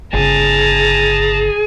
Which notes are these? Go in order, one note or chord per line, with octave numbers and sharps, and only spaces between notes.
G1 C#3 G#4 A5 A#5